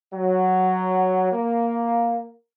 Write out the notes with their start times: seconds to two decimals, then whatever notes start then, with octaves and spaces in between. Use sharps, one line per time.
0.13 F#3
1.32 A#3